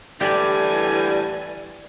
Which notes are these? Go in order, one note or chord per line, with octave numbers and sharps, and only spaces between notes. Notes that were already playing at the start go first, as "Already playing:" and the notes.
A2 D3 E3 G3 G4 D5 G#5